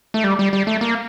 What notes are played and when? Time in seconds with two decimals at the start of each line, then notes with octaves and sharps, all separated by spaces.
0.14 A3
0.24 G3
0.39 G3
0.53 G3
0.67 A3
0.81 A#3